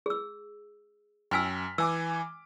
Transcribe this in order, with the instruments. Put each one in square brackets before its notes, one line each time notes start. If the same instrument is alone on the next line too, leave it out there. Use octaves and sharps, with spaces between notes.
[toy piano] G#4 E6
[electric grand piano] F#2 F6 B6 [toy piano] G5 G#5 E6
[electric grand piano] E3 G#5 D6 [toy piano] E6